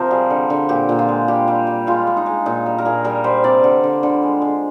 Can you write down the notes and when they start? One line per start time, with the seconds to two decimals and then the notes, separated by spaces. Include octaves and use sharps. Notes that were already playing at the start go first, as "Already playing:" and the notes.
Already playing: C3 F3 A#4 C5
0.11 G3 G#4
0.30 D3
0.50 D3
0.69 A#2 G4
0.89 A#2
0.99 F4
1.09 G#3
1.28 G3 G4
1.48 G3
1.67 G3
1.87 G#3 F4
2.07 G#3
2.17 D#4
2.26 G#3
2.46 A#2 D#4
2.66 G3
2.78 A#4
2.85 A#2 G#4
3.04 G3 A#4
3.24 G3 C5
3.44 C3 D5
3.64 D3
3.84 D3
4.03 D3
4.23 G#3
4.42 G#3